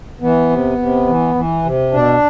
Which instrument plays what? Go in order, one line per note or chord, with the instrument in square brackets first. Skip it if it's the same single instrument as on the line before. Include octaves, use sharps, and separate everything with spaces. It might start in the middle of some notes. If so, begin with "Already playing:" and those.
[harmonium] E3 B3
C3
C3
E3
E3
C3
B2 D4